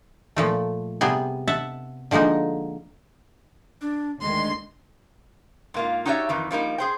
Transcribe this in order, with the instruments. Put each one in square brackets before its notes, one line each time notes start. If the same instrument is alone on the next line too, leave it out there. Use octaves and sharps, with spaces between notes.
[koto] A#2 F3 A3
C3 G3 B3 G#4
E5 F#5 A5
D3 F3 G#3 A#3 D#4
[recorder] D4
[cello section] D2 D3 D#3 [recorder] G#3 [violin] C6
[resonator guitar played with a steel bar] G#2 A#3 F4
D#4 F#4 G4 C#5 D5 E5
F2 D#3 E3
F3 G3 A#3 D#4
G#4 C5 G5